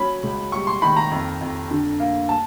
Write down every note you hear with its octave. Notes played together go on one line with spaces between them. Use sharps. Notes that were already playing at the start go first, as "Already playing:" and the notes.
Already playing: F#3 C#4 B5
C#2
G3 C#6
C6
D#3 B5
A#5
F2
F2
D3
A#3
A5